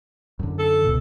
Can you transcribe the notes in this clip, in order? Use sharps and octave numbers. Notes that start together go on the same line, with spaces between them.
F#2 D3
A4
C#2 B2